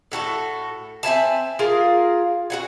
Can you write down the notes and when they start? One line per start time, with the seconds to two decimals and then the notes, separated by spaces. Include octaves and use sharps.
0.12 A2 F#4 A4 A5
1.03 C4 E5 G#5 A5
1.59 F4 G#4 A#4 F5
2.50 F#4 F#5 G#5